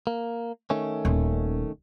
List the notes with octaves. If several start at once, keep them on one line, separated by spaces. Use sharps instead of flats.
A#3
D#3 A3 C#4
D#1